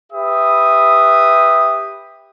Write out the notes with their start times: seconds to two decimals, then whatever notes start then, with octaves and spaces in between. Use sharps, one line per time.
0.13 G4 B4 E5 D#6